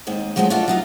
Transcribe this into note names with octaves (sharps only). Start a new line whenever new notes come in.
D#2 G#2 C4 D#5
F3 F#3 G#3 A3 C4
D4 F4 F#4 A4 E5
F#3 D#4 F4